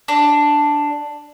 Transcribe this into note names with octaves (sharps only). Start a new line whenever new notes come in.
D4